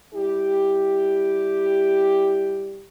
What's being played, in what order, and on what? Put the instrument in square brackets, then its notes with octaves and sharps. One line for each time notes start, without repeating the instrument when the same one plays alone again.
[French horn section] G3 E4 G4